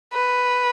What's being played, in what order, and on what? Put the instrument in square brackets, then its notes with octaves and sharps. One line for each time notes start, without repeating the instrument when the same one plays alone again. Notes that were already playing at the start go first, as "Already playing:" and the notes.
[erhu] B4